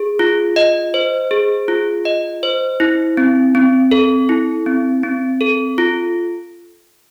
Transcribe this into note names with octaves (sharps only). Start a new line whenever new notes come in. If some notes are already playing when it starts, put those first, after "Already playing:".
Already playing: G#4
F4
D#5
C5
G#4
F4
D#5
C5
E4
C4
C4
A4
E4
C4
C4
A4
F4